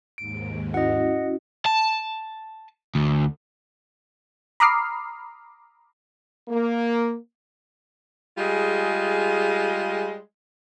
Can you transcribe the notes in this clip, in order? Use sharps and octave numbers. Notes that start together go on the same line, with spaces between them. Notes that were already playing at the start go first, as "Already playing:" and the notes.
D#2 G#2 D7
C#4 E4 F#4 D#5 F#5
A5
D2
A#5 B5 D6 D#6 F6 C7
A#3
G3 G#3 F4 G#4